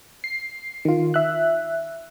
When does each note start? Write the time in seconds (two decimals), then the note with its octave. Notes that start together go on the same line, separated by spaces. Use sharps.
0.24 C7
0.85 D#3 F4
1.14 E5 F#6